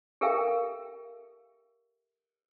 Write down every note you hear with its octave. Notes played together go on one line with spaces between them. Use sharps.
G4 A4 A#4 E5 F5 G5